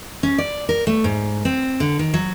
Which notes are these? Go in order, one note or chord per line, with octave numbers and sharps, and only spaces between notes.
C#4
D5
A#4
A3
G#2
C4
D3
D#3
F#3